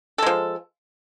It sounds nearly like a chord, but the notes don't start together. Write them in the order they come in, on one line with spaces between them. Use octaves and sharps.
A4 G#3 F3